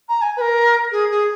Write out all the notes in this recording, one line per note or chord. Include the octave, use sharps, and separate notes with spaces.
A#5
G#5
B4
A#4
G#4
G#4